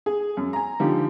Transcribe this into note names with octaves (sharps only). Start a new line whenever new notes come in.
G#4
F#2
G#5 A#5
D3 F3 D#4 G4